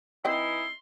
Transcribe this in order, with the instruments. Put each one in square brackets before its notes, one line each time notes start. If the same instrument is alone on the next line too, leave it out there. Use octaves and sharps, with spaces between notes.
[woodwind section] E3 D#4 E4 [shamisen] C4 D#5 G5 [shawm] C6